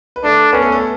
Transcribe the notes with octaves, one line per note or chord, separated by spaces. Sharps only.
B4
A3 D4 A4
B3 C#4 B4
A3 A4
A3 A4